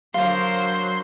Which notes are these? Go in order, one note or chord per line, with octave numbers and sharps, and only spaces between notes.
D3 F#3 A#4 C5 F5 C6